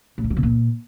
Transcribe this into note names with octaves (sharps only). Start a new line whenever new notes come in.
A2
E3
F#3
B2
A#2